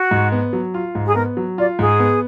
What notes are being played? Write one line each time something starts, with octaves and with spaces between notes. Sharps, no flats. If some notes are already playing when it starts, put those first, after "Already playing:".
Already playing: F#4
G#2
B3
F#3
F4
G#2
G#4
B3 A#4
F#3
F4 D5
G#2 G#4
B3